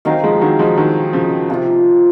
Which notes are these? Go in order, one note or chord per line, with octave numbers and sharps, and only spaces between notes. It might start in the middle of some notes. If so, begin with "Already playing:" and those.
D#3 F#3 C4 D#4 A#4 F5
F3 G#3
D#3 F#3
F3 G#3
D#3 F#3
C#3 F3
C3 F3 A#3 F4